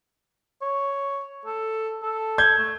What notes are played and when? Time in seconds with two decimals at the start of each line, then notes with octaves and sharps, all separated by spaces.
0.62 C#5
1.45 A4
2.02 A4
2.38 G6 G#6
2.58 A3